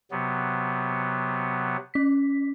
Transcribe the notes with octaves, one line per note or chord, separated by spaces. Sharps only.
C3 F#3 B3
C#4 B6